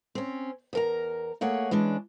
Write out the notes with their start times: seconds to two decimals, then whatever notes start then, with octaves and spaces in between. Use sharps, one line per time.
0.15 C4 C#4
0.73 E2 A#4 A#5
1.41 A3 A#3 G#4 C#5 F#5
1.71 E3 G#3 C#4 D4